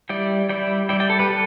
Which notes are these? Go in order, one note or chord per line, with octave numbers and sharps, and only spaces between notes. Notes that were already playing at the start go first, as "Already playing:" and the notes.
G3 E4 D5 G5
G3 E4 D5 G5
G3 E4 D5 G5
D5 G5
A4
G4 B4
G3 A4